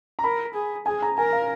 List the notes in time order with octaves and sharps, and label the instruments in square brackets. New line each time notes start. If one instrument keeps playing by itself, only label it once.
[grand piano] A#5
[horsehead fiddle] A#4 [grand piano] B5
[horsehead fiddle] G#4
[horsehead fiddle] G#4 [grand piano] G#5
[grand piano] A#5
[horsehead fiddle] A#4 [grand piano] G#5
[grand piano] F5